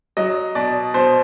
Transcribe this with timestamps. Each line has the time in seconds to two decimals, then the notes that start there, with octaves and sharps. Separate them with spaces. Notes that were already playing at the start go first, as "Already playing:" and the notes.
0.17 F#3 D#5
0.55 B2 D5
0.94 B2 C5